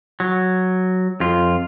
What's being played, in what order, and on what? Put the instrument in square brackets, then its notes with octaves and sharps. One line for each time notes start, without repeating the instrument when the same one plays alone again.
[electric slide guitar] F#3
F2 F4